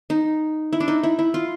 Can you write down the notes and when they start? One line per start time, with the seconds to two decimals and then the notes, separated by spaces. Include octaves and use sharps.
0.10 D#4
0.73 E4
0.80 D4
0.88 D#4
1.03 E4
1.19 E4
1.34 F4